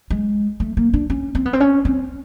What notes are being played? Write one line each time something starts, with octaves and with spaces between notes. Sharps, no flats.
G#3
A3
A#3
D4
C#4
C4
B3
C4
C#4
C4